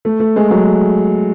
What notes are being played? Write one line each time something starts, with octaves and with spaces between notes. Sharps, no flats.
A3
A3
G#3
F#3